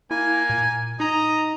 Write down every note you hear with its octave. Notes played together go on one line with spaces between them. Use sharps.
A#3 E4 G#5
A#2
D#4 D#5 A#5